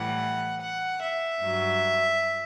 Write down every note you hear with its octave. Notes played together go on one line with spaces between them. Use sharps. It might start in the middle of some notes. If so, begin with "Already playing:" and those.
Already playing: A2 E3 G3 F#5
F#5
E5
G2 F#3